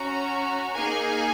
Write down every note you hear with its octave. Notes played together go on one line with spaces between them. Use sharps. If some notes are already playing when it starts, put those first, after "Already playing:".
Already playing: C#4 F#4 A#5
A#3 D#4 G#4 G#5